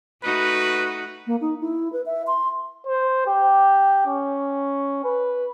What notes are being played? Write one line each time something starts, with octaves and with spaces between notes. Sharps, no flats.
A3 D#4 F#4 B4
A#3
D#4
E4
B4
E5
C6
C5
G4
C#4
B4